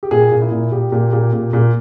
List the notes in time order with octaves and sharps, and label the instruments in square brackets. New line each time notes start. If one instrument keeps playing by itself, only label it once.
[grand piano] G4
A#2 G#4
A#2
E4
A#2
A#2 G4
A#2
A#2
A#2
A#2